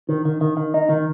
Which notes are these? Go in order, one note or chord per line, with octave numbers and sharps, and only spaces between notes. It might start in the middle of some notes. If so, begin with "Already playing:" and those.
D#3
D#3
D#3
D#3
D#4
D#3